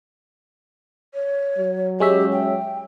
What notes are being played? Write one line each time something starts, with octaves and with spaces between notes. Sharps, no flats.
C#5
F#3
G#3 C#4 G4 E5
G5